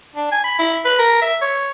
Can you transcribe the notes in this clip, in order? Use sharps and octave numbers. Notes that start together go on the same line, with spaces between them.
D4
G#5
B5
E4
B4
A#4
E5
C#5